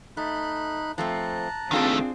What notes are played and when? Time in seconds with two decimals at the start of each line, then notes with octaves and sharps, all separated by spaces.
0.17 A3 D#4 B5 F#6
0.98 F3 A3 C4 A5 A#5 F#6
1.71 D#3 A3 C4 D4 F4 G#4